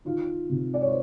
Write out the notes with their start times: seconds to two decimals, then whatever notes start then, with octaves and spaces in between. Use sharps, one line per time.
0.05 D#3 F4
0.49 C3
0.74 D5
0.81 C#5
0.88 C5